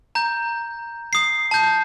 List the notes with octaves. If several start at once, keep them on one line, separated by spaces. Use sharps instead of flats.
A#5 G6
D#6 C7
A5 G6